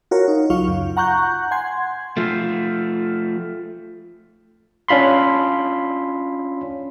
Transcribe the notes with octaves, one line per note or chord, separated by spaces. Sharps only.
F4 F#4 A#4 C#5
D#4
C#2 F#3 F4 F5 C#6
F#2 C#3
F#5 A#5 C#6 F#6 G6
F#5 G#5 C6 G#6
F3 A3
C#4 D4 F4 B5 C6